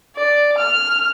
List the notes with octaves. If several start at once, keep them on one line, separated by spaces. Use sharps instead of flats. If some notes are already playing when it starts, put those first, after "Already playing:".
D5
F6